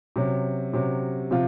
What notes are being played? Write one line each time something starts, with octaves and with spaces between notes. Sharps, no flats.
C3 F#3 C#4
C3 F#3 C#4
C3 F3 C4 F4